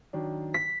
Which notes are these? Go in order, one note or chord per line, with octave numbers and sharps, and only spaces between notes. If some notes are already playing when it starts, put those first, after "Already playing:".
D#3 F#3 D4
B6